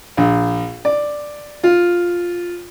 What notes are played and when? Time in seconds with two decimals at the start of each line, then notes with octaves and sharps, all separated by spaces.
0.17 A#1
0.85 D5
1.64 F4